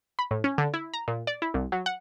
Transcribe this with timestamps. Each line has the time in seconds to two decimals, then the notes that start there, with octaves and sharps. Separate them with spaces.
0.19 B5
0.31 A2
0.44 C#4
0.58 D3
0.74 E4
0.94 A#5
1.08 A#2
1.27 D5
1.42 E4
1.54 C2
1.72 F#3
1.86 F#5